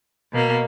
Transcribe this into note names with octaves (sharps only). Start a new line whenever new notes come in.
B2 A#3